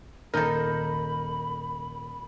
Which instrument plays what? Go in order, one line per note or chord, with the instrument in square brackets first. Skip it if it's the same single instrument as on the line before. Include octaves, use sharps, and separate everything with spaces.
[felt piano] D#1 G6 A#6 [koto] D#4 A4 [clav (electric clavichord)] A#4 [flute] B5